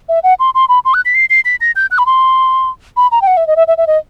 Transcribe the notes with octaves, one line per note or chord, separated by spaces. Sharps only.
E5
F#5
C6
C6
B5
C6
F#6
B6
C7
C7
B6
A#6
G6
F#6
B5
C6
B5
A#5
G5
F#5
E5
D#5
E5
E5
E5
D#5